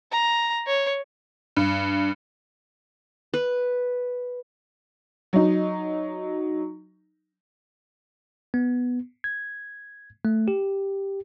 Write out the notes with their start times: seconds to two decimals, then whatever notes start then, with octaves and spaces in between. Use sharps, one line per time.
0.12 A#5
0.67 C#5
1.57 G2
3.34 B4
5.33 F#3 D#4
8.54 B3
9.24 G#6
10.25 A3
10.48 G4